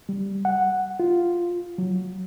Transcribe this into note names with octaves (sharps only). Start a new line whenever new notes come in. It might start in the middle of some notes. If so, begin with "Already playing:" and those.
G3
F#5
F4
F#3